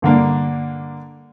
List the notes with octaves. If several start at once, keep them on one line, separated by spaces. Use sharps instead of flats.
G2 D3 A#3 D4